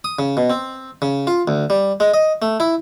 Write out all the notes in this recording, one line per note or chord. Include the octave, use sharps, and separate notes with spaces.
D#6
C#3
B2
C4
C#3
F4
D2
G3
G#3
D#5
A3
E4